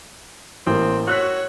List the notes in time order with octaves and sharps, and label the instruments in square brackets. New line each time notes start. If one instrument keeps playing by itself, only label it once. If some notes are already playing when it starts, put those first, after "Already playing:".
[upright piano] A1 A#3 [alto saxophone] C4
[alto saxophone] F#4 [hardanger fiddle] C#5 [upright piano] E6 F#6 B6